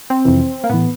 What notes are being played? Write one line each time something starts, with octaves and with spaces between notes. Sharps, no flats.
C4
F2 C3 E3
A#3
A2 E3 B3